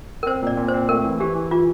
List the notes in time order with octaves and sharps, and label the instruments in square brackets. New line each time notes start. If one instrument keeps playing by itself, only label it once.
[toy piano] A#4
[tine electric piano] C4 [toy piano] C5
[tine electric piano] A#2 [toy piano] D5
[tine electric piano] A#2
[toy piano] C5
[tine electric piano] C4
[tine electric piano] A3 [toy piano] A#4
[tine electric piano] E3
[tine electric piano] E3 [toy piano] G4
[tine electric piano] E3
[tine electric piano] E3 [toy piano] F4